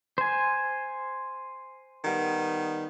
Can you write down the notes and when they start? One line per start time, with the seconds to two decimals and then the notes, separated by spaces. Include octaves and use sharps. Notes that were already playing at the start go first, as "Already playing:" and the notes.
0.18 C5 G#5
2.05 D#3 G3 B3